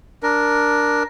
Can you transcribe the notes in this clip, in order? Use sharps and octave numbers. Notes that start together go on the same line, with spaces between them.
D4 A#4